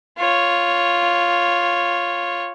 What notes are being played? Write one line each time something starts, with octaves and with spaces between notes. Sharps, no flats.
F4 C#5